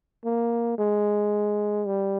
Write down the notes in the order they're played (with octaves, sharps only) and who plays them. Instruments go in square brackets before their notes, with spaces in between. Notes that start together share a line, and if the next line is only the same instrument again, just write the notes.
[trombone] A#3
G#3
G3